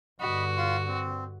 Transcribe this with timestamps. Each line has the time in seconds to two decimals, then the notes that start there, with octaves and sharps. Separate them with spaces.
0.20 G2 D3 F#4 D#5 B5
0.57 F4 C6
0.87 C4